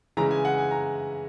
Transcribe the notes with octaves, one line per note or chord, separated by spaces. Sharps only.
C#3 E3 G#3 A#5
G#5
F#5
G#5
A#5